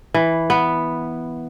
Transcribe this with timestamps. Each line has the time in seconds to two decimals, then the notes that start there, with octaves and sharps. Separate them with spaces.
0.14 E3
0.50 B3